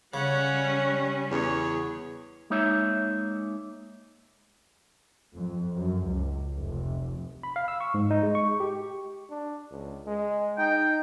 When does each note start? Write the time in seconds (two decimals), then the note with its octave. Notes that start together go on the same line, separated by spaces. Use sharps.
0.14 C#3 G3 C#4 C#5 F#5
1.31 E2 G#4 C#5
2.50 G#3 A#3 D#4 C#5 E5
5.35 F2
5.75 F#2
6.07 C#2
6.56 F1
7.43 B5
7.56 F5
7.68 E6
7.80 C#6
7.94 G#2
8.11 D#4
8.23 G#3
8.35 C#6
8.60 G4
9.30 D4
9.71 C#2
10.07 G#3
10.58 D#4 G5